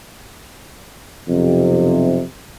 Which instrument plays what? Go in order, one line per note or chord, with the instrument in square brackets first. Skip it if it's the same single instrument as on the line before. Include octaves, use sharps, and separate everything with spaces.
[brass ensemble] B1 F2 C3